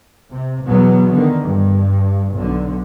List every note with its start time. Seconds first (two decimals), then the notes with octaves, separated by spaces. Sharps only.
0.30 C3
0.66 E2 B2 F#3 B3
1.13 D3 D#3
1.42 G2
2.33 B1 D3